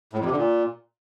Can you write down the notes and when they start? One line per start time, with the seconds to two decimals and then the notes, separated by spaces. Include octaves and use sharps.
0.13 A2
0.19 F2
0.25 C3
0.31 D3
0.37 A#2